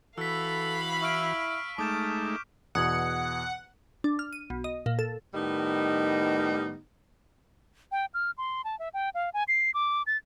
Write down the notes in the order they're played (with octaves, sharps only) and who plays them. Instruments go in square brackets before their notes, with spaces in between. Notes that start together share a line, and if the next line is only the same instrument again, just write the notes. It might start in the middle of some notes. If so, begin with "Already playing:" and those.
[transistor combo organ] E3 F#4 [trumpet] A4 [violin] F5 B5 [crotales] E6 B6
[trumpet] E4 [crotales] C#6 F6 D7
[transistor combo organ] G#3 A3 D#4 [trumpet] A5 [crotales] D6 G6 E7
[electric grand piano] E2 B2 [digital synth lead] F#5 [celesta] D#6 G#6
[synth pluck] D4
F6
D#7
B1
D#5
A#2
A4
[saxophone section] A2 D#3 G3 B3 D#4
[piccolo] G5
F6
C6
A5
E5
G5
F5
G#5
C7
D6
A6